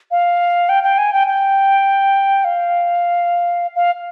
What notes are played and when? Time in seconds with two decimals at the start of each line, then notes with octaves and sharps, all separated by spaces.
0.11 F5
0.69 G5
0.83 G5
0.98 G#5
1.13 G5
1.27 G5
2.44 F5
3.75 F5